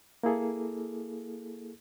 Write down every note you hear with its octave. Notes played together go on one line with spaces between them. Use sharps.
A#3 E4 G#4 A4